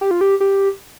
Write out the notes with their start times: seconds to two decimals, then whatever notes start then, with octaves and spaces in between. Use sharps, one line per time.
0.01 G4
0.11 F4
0.21 G4
0.40 G4